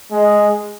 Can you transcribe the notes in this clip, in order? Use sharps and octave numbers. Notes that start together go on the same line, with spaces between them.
G#3